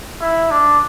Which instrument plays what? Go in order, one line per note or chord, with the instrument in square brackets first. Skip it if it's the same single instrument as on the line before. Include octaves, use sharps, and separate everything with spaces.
[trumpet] E4
D4